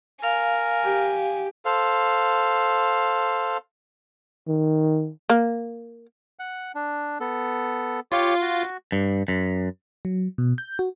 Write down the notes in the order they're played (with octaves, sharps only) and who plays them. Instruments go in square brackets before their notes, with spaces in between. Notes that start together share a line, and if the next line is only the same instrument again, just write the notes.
[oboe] A#4 [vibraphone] F5 [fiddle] G#5
[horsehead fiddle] G4
[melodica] A4 C5 F5
[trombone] D#3
[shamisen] A#3
[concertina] F#5
D4
B3 A4
[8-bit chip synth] F4 F5 [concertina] G4 C#5
[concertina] F#4
[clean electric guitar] G2
F#2
[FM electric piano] F#3
B2
G6
F#4